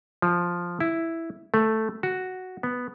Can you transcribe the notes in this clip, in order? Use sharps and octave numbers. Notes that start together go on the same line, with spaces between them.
F3
E4
A3
F#4
B3